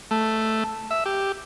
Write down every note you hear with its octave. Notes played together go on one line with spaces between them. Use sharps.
A3
E5
G4